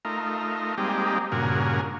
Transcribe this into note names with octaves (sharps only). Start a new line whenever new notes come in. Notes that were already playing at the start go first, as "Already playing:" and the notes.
A3 D#4 F4 A#4
G3 G#3 A#3 C4 D#4 G4
G2 A#2 C#3 F#4 A#4 G#5